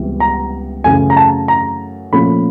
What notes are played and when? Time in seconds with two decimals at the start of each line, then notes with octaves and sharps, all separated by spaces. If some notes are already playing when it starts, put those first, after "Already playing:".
Already playing: C#2 C3 E3 G3 B3
0.20 A#5
0.84 F#2 C#3 E3 A3 G#5
1.10 A#5
1.17 A5
1.48 A#5
2.12 A#2 F3 A3 C#4 B5